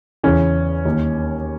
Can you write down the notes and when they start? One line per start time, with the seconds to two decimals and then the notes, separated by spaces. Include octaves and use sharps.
0.23 E2 C#3 E3 C#4
0.85 D#2 D#3